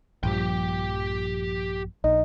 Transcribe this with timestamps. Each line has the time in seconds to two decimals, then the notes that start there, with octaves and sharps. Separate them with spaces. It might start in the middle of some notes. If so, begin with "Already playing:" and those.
0.23 A#1 G2 F3 G4 G5
2.04 A#1 D#4